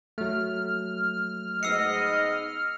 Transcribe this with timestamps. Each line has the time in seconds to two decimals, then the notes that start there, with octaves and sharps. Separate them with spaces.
0.18 F#3 A3 F6
1.63 G#2 B3 D#5 E6 C7 C#7